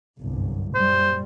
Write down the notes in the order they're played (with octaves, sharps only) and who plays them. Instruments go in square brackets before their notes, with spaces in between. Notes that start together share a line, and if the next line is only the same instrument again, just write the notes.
[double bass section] G1 C2 F#2
[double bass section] F#2 A#2 G3 [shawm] C5